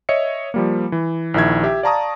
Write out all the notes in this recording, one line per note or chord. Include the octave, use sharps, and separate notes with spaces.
C#5 D#5 E5 C#7
F3 G3 A#3
E3
A#1 D#3 E4 E5 G#6
G4 E5
D5 F5 A5 A#5 C#6 D#6